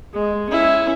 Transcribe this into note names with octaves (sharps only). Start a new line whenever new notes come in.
G#3
C#4 E4